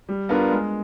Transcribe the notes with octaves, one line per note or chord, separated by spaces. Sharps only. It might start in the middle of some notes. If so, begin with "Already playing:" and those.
G3
B3 D4 F4 A#4
G#3